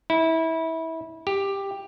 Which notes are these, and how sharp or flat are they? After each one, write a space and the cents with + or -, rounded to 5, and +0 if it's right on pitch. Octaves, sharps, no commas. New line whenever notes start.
E4 -25
G4 +10